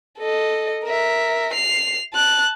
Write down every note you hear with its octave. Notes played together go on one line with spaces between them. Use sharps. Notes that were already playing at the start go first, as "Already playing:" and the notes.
A4 D#5
A#4 E5
C7 F7
A5 F#6